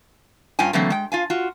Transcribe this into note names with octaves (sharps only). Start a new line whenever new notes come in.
G2 C#4 F4 G5 G#5
D3 E3 F#3 A3 A#3 C4
G#3 G5
F4 F5 G#5
F4 F#4